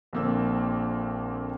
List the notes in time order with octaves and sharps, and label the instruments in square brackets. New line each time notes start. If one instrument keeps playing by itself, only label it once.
[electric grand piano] A#1 D3 A#3 C4 E6